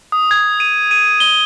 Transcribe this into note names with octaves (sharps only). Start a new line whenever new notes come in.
D#6
G#6
D#7
D#7
G7